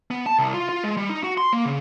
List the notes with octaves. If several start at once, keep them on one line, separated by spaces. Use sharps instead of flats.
B3
A5
C2
F4
F4
G#3
G3
D#4
F#4
C6
A#3
C#3